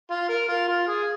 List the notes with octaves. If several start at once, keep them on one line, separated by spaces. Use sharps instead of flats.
F4
A#4
F4
F4
G#4